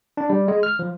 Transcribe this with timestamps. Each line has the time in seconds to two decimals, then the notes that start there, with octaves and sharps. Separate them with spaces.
0.17 D4
0.30 G3
0.48 G#3
0.63 F6
0.79 F3